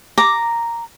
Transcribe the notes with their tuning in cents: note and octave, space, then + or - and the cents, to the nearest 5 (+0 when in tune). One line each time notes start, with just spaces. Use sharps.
A#5 -5 D6 -5